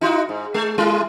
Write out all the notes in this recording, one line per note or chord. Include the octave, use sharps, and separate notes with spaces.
D#4 E4 F#4
G#2
G#3
G3 E4 F4